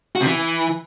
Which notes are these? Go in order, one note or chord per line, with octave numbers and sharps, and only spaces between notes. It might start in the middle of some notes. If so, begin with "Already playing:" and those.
F#4
C3
E3